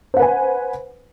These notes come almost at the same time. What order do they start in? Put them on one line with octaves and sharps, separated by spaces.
C5 F#5 B4 G#5